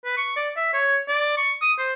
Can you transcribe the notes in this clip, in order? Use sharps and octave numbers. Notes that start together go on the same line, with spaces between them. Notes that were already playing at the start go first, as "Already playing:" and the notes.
B4
C#6
D5
E5
C#5
D5
C#6
D#6
C5